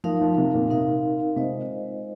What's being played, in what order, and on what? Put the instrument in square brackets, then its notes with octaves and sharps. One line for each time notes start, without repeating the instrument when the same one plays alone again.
[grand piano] F3 [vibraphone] D#4 A#4 F5
[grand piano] F3
C3
A#2
[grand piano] C3 [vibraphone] C4 D#4 A#4 F5
[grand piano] C3 [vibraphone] G#3 F4 C5 D#5